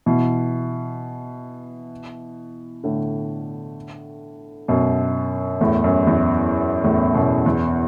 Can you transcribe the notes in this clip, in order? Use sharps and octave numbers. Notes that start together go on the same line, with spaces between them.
B2 E3
A2 D3
F#2 B2
E2 A2
F#2
E2
E2 A2
F#2 B2
E2